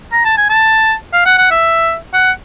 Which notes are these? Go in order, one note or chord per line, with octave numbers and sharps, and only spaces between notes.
A#5
A5
G#5
A5
F5
F#5
F#5
E5
F#5